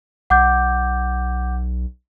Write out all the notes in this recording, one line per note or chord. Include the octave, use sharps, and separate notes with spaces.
B1 F#5 D6 G6